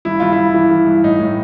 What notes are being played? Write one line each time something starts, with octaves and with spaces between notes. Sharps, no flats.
G2 E4
G2 F4
E4
G2
E3
E3
G2
A2 D#4
A2